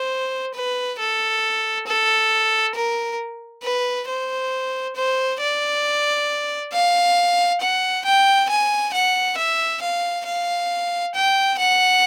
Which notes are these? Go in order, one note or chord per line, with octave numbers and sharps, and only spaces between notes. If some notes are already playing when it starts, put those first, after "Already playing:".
Already playing: C5
B4
A4
A4
A#4
B4
C5
C5
D5
F5
F#5
G5
G#5
F#5
E5
F5
F5
G5
F#5